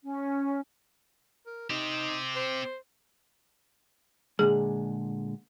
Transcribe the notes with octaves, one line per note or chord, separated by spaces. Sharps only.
C#4
A#4
C4 D#4 G4
C5
A#2 D3 G#3 G#4